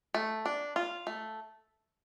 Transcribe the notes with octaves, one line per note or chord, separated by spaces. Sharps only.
A3
D4
F4
A3